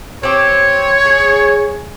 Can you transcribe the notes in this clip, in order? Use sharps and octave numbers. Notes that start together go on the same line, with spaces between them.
C4 G4 C#5
G#4